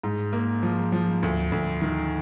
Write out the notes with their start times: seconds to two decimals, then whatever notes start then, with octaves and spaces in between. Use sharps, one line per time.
0.03 G#2
0.33 A#3
0.63 F3
0.92 F3
1.23 D2
1.52 D2
1.82 D#3